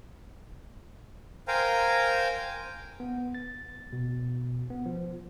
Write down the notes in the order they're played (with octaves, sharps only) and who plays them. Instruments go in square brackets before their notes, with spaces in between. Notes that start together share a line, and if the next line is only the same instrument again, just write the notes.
[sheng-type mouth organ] A#4 C5 F5 G5 G#5 A#5
[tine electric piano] B3
A6
B2
B3
F3